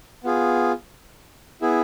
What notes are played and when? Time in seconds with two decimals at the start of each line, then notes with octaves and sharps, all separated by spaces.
0.24 B3 F4 G#4
1.62 B3 E4 G#4